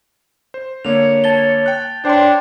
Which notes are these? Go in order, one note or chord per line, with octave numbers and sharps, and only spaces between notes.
C5
D3 A#3 C#5 F7
A5 A6 G7
G5 F#6
D4 C5 C#5 G5 C6